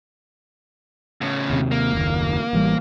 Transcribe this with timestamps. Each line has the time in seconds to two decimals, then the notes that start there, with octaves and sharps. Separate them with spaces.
1.21 A2 C#3
1.50 D#2 C3
1.72 A#3
1.93 F#1 D#2
2.53 A1 E3 G3